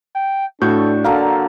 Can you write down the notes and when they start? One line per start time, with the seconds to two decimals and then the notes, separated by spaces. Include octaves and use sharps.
0.15 G5
0.61 A2 D4 F#4 A4 C#6 G6
1.04 D3 F#3 A#3 A4 F5